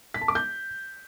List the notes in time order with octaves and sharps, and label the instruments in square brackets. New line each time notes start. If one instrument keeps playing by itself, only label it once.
[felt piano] B6
A5
D6
G6